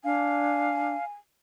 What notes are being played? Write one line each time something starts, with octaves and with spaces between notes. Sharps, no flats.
D4 F5 G#5